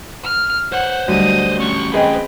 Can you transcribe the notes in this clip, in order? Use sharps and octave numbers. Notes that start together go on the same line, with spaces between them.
F6
C5 C#5 F#5
D2 F#3 G3 D#5 D#6
A3 C#4 C#6
C4 G#4 B4 D#5 G5